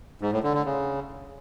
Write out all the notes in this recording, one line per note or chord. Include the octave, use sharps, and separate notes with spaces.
G#2
A2
D3
D3
C#3